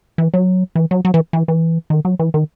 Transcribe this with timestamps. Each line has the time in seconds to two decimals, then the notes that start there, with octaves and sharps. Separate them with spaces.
0.18 E3
0.34 F#3
0.75 E3
0.91 F#3
1.05 F#3
1.14 E3
1.33 E3
1.48 E3
1.90 D#3
2.05 F#3
2.19 E3
2.34 D#3